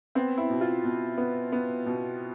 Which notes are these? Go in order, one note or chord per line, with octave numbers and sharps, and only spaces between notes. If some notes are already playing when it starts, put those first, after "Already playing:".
B3 C4
E4
B2
F4
B2
B3
B3
B2